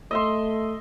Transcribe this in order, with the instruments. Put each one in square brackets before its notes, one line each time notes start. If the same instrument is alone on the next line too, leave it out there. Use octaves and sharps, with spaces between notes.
[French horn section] A3 [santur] D#5 E5 C6